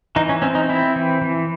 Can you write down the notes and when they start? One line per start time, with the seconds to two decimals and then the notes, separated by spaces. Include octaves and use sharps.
0.16 E3 D#4
0.29 C#4
0.42 C4 C#4
0.55 D#4
0.69 C4 E4
0.96 E3
1.22 E3